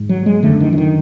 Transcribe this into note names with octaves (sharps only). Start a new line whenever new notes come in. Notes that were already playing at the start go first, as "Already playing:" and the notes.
Already playing: G#2
F#3
G#3
F#2 D3 A3
D#3
E3
D#3